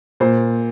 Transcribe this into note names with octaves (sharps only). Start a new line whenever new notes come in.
A#2 C5